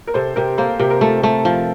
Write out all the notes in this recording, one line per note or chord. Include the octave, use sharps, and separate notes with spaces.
A#4
C3 A4 C5
C3 G4 A#4
A#3 A4 C5
C3 G4 A#4
A#4
A3 F4 A4
A3
F3